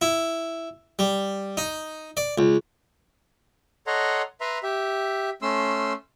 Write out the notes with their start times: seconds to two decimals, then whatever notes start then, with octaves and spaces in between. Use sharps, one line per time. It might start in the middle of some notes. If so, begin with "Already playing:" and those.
0.01 E4
0.99 G3
1.57 D#4
2.17 D5
2.38 C#2
3.87 A4 C#5 D#5 F#5 A#5 C6
4.41 B4 E5 A#5 C6
4.63 G4 E5
5.42 A3 C#4 C6 E6